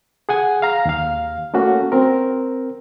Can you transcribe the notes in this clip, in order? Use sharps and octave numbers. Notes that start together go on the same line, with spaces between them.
G#4 F#5 G#5
F5 A#5
D#2 F5
A3 A#3 C#4 F#4
C4 A#4